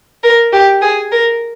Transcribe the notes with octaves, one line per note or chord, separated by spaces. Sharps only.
A#4
G4
G#4
A#4